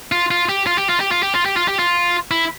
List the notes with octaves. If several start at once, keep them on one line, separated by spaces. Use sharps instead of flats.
F4
F4
G4
F4
G4
F4
G4
F4
G4
F4
G4
F4
G4
F4
E4